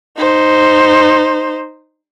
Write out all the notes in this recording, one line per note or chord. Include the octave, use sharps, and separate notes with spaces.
D#4 C5